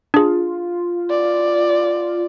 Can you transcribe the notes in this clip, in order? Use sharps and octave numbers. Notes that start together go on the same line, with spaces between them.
D4 F4 G#4
D5